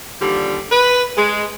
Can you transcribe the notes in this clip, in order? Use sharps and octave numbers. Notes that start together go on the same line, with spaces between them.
D#2 D3 F3 G3
B4
G#3